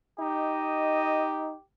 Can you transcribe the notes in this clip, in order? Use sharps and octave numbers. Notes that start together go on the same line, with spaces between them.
D#4 G4 D#5